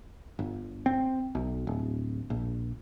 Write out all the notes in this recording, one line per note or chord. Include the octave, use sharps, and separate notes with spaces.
G1
C4
B1
D1
A#1